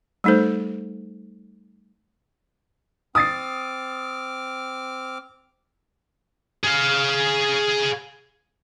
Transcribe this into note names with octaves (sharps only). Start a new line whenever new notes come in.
G3 A3 D#4 A4 C5
C4 D6 D#6 F6 A6 C7
G#4 F5